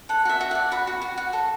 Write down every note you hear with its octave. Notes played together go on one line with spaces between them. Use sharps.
A4 F#5
F#4 E5
F#4
D5 F#5
F#4 B5
F#4
F#4
F#4
A4